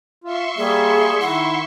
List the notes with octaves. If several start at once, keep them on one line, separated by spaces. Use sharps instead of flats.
F4 E5 C6 C#6
G3 A#3 G#4
D#3 E4 F#5